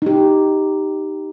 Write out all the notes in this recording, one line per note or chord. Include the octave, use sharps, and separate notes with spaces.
D#4 G4